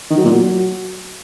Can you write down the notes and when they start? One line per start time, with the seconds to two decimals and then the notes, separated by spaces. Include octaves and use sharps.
0.10 D#3
0.17 F#3
0.25 A#2
0.32 F#3